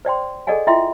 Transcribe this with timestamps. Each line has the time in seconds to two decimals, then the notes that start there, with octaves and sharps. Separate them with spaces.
0.05 C5 D5 G5 C6
0.47 G#4 A4 D5 D#5 F#5 G#5
0.67 E4 F4 E5 G5 C6